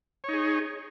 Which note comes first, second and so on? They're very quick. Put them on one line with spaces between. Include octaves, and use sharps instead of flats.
C#5 D#4 G#4